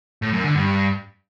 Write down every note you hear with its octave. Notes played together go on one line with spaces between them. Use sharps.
A2
F#2
D3
G2